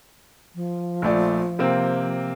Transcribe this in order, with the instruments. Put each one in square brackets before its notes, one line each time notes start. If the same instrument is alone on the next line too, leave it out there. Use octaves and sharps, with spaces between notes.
[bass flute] F3
[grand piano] A#1 A3 D5
C3 A#3 C4